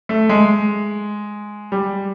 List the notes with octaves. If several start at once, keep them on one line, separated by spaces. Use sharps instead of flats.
A3
G#3
G3